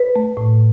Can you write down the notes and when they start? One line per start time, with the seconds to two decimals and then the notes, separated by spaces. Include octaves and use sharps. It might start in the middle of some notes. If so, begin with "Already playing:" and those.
Already playing: B4
0.16 A3
0.37 A2